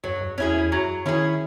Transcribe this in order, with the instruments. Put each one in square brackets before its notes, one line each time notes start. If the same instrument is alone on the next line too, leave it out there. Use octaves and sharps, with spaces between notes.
[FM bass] F#2 [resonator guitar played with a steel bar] F#3
[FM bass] F#2
[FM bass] E2 [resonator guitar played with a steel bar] C#4 E4 G#4
[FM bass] E2
[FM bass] F#2 [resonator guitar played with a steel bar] F#3
[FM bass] D#3 [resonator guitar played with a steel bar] C#4 E4 G#4